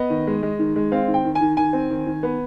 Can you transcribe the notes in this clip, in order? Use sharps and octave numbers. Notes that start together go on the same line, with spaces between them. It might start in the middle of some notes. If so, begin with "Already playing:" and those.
Already playing: B3 D#5
D#3
G#3
G#3
D#3
G#3
C4 F5
D#3
G5
D#3
G#5
D#3
D#3 G#5
C4
D#3
D#3
B3